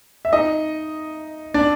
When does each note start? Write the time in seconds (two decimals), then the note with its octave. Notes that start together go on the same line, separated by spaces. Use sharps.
0.25 E5
0.33 D#4 D#5
1.54 D4 D5